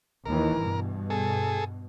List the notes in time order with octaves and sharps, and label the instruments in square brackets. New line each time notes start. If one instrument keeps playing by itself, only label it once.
[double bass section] D#2 D#3 E3 [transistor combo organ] A#4
[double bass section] G2 B2
[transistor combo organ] G#4 A4